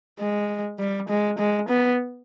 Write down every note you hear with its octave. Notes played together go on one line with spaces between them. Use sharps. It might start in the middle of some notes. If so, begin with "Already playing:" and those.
G#3
G3
G#3
G#3
B3